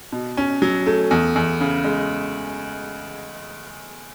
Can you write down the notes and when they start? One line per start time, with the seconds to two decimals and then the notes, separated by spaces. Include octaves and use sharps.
0.12 B2
0.37 C#4
0.62 F#3
0.86 A3
1.11 E2
1.36 E2
1.60 C#3
1.84 G#3